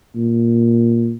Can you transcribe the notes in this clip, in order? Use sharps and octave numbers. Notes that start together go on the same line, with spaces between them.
A#2